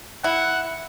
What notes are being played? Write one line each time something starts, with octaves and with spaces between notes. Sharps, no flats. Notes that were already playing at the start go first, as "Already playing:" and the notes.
E4 F#5